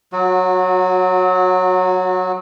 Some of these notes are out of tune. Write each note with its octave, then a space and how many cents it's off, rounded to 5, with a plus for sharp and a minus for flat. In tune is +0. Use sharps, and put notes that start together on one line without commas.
F#3 -10 F#4 -30